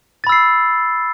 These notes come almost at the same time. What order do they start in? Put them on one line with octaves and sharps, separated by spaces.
A6 B5 E6 C7